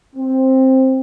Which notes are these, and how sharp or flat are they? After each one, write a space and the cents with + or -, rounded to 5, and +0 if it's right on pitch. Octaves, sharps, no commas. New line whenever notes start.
C4 +10